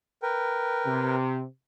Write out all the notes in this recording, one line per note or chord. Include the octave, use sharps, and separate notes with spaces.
A#4 B4 G5
C3